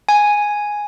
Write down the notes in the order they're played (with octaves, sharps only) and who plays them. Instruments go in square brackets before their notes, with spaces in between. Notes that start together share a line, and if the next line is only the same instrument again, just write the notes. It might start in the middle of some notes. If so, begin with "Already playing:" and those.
[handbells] G#5